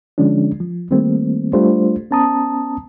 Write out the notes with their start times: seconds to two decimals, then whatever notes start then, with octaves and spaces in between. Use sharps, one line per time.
0.18 D3 F3 G#3 C#4 D4
0.60 F3
0.91 D#3 G3 A3 A#3 C4
1.53 G3 A3 D4 F4 C5
2.11 B3 C#4 A5 A#5 D#6